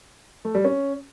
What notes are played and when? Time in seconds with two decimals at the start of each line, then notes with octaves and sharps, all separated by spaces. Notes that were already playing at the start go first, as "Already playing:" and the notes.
0.45 A3
0.55 G3
0.65 C#4